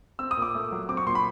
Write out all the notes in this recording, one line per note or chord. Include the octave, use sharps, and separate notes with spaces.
C4 E6
D#6
A#2
D6
A3
F#3
C4 D6
C#6
A#2 C6
B5